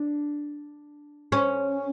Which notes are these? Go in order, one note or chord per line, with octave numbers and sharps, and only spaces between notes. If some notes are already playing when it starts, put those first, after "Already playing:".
Already playing: D4
C#4